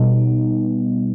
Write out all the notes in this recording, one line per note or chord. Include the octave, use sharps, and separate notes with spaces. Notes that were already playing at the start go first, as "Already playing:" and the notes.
Already playing: B2 G3 B3 D#4